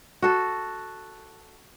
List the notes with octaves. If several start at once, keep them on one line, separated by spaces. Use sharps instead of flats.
F#4 A4